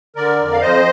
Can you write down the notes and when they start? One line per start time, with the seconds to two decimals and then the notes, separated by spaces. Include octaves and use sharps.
0.16 D3 A#4 D5
0.39 F2
0.52 F5
0.62 F2 C5 D#5